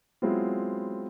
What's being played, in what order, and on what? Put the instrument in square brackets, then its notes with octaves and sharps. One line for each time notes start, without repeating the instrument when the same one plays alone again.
[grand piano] F#3 G#3 B3 C4 E4 F4